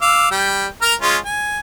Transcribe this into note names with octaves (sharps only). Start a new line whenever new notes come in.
F5 D6 E6
G3 G5
A#4 A#5 F6
G#3 C#4 F4
G#5